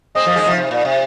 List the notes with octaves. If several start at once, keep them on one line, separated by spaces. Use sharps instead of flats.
G#3 C4 D#5
F3 A#3
D#3 G#3
C3 F3
C3
A#2
C3